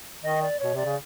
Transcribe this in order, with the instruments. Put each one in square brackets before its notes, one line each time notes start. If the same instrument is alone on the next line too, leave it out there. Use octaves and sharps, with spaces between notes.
[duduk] D#3 [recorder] D#5
[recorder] D5
[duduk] B2 [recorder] C#5
[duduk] C3 [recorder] D5
[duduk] C#3